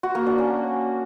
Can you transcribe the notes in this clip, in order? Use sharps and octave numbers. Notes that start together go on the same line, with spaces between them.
F#4
A#3
D4
C#4